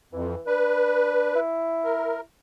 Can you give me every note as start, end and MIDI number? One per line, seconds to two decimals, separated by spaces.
0.13 0.35 41
0.13 0.41 52
0.47 1.31 62
0.47 1.40 71
1.35 2.20 64
1.84 2.21 70